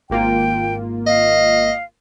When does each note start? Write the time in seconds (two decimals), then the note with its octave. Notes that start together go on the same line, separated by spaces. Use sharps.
0.10 G#1 A#3 F4 G5
1.07 D#5 F5